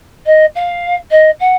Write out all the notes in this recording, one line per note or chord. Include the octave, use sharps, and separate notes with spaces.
D#5
F5
D#5
F#5